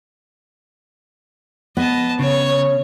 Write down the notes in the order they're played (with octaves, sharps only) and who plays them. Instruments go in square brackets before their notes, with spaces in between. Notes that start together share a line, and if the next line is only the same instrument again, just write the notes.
[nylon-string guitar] B3 [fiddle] D#5 A5
[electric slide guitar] C#3 [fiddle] C#5